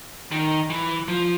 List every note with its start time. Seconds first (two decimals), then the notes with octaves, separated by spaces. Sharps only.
0.32 D#3
0.70 E3
1.08 F3